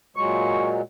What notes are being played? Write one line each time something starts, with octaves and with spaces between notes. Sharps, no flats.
A#2 F#3 G#3 C#6